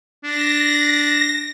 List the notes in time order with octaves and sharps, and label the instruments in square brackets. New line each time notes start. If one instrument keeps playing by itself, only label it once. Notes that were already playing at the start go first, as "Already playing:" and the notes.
[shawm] D4 [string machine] A#6